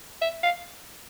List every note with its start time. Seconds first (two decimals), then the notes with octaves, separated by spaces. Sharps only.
0.22 E5
0.43 F5